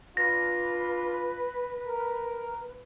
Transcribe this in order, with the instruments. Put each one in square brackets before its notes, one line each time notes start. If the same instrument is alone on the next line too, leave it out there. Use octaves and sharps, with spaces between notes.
[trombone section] D4 F4 [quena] B4 [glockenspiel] A#6
[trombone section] A#4